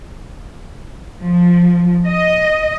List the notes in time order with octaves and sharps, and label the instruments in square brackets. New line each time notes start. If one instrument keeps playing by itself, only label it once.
[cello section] F3
D#5